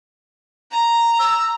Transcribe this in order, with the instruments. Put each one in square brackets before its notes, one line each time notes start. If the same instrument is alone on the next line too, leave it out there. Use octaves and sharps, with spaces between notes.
[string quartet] A#5
[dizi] E6